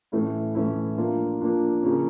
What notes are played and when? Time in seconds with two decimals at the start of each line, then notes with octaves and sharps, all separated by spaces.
0.12 A2 E3 A3 C#4 E4
0.55 A2 E3 A3 C#4 E4
0.97 F3 A#3 D4 F4
1.40 F3 A#3 D4 F4
1.83 C#3 F3 A#3 C#4